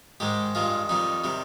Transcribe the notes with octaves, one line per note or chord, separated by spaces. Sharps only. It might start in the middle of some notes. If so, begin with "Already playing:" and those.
G#2 D#3 G#3 G4
G2 D#3 G#3 F4
F2 D#3 G3 D#4
C3 D#3 G3